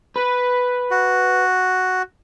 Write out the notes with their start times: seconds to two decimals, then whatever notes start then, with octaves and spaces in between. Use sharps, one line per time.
0.16 B4
0.91 F#4